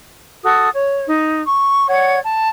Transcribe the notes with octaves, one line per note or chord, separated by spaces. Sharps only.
F#4 A4 D#6
C#5
D#4
C#6
C#5 D5 F#5 G#6
A5